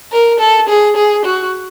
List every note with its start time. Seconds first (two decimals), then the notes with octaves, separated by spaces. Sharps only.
0.12 A#4
0.40 A4
0.68 G#4
0.96 G#4
1.25 F#4